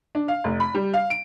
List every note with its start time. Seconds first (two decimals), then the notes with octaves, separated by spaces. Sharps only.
0.15 D4
0.28 F5
0.44 F1
0.60 B5
0.75 G3
0.94 F5
1.10 D7